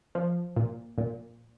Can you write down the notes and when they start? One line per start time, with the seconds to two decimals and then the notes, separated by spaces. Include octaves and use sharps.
0.15 F3
0.56 A#2
0.98 A#2